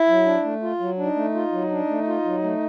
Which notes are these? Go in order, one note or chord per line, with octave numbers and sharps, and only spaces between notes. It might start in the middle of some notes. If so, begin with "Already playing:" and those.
Already playing: E4
F#3
D4
A3
F4
F#3
D4 D#4
A3
F4
F#3
D4
A3
F4
F#3
A3